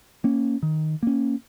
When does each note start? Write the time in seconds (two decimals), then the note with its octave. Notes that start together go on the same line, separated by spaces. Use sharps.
0.24 A#3 C#4
0.63 D#3
1.03 A#3 C#4